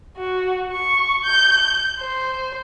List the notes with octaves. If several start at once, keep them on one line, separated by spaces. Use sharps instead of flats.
F#4
C#6
G6
C5